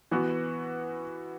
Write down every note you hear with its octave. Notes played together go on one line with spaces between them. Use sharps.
E3 B3 F#4